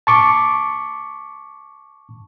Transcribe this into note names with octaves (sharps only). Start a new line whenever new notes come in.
A5 C#6 D6